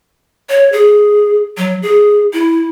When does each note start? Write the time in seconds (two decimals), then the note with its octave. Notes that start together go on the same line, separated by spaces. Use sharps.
0.50 C#5
0.72 G#4
1.57 F#3
1.82 G#4
2.33 E4